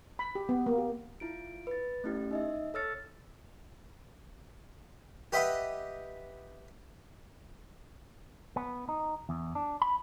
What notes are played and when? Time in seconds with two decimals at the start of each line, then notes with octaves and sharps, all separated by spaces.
0.19 B5
0.35 G4
0.49 B3
0.66 A#3
0.78 G4
1.20 E4 F4 D7
1.67 B4 A6
2.04 A3 C#4 E4 G4
2.31 D#4 D#5 E5
2.74 A4 C#5 E6 F6 A6 C#7
5.32 G4 B4 D#5 E5 F#5 B5
8.56 B3
8.89 D#4
9.29 E2
9.55 D4
9.82 B5